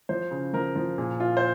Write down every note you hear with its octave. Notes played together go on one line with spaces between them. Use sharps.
F3 C5
C#3
F3 A#4
F3
A#2 G#4
A#2 F4
C5